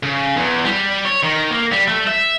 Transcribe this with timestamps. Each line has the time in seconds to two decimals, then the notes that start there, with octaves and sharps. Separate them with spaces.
0.03 C#3
0.37 E2
0.65 G3
1.05 C#5
1.23 D#3
1.50 A#3
1.72 G3
1.88 A3
2.07 E5